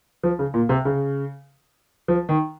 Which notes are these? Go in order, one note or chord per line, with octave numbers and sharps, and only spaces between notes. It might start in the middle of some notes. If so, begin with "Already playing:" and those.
F3
C#3
A#2
C3
C#3
F3
D#3